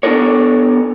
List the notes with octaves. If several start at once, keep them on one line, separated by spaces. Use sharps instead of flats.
B3 D4 F4 A4 A#4 C#5